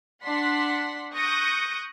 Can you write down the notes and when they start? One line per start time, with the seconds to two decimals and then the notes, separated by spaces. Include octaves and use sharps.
0.24 D4 F#5 C6 B6
1.15 C#6 D#6 F#6 G6 A#6 C#7